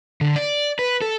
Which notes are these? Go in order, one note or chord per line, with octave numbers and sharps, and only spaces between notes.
D3
D5
B4
A4